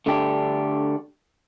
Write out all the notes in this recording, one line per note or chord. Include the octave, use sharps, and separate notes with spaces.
D3 A3 D4 G4